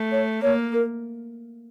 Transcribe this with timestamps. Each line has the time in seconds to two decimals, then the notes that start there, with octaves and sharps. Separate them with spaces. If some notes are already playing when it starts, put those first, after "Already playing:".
Already playing: A3
0.12 C#5
0.43 A#3 C#5
0.73 A#4